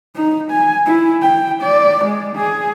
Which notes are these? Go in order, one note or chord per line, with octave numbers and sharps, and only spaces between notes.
D#4
G#5
E4
G5
D5
G#3
G#4